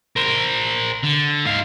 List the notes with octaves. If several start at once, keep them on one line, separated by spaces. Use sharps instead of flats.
A#4 C5
D3
G#2 F5